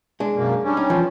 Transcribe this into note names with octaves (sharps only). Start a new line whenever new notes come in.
G#3 D4
F#2 B2 A#3
G3 C#4 D4
D#4
E3 F3